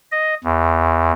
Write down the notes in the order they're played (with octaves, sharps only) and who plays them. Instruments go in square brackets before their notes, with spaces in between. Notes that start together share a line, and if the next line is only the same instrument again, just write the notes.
[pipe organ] D#5
E2